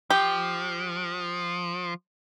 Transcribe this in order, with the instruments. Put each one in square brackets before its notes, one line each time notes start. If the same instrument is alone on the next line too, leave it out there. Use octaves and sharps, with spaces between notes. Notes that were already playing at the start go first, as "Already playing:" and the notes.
[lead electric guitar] F3 [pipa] G4